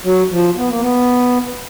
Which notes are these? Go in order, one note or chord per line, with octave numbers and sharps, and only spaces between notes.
F#3
F3
B3
A#3
B3